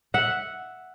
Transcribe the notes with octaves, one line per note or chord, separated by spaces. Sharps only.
E5 F#5